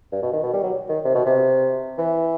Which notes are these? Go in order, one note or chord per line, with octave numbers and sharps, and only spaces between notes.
G2
B2
D#3
B2
G3
F#3
D#3
C3
B2
C3
E3